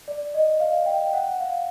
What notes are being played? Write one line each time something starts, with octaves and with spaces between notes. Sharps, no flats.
D5
D#5
F5
G5
F#5
F5